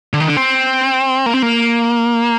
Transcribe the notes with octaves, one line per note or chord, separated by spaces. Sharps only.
D3
D#3
D3
C4
A#3
C4
A#3